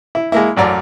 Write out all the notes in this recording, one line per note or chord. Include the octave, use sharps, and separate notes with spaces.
E4
G#3 A#3 E4
A1 F#2 D5 A#5